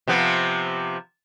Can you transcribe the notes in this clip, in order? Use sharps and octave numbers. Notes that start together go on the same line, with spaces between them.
C3 F3 B3